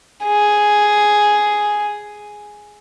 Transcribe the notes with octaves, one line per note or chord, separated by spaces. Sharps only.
G#4